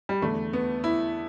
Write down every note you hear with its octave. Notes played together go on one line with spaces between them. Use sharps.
G3
E2 D3 A3
B3
E4